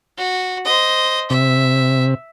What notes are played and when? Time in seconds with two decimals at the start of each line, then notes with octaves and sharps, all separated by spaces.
0.18 F#4
0.65 C5 D#5
1.30 C3 E5